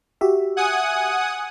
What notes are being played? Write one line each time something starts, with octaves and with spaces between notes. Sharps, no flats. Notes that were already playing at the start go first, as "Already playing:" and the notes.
F#4 G4 E5
F#5 G#5 D#6